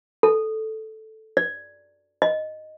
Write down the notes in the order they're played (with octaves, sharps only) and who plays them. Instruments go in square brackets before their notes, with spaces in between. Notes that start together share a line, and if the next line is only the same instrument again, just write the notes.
[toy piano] A4
D5
D#5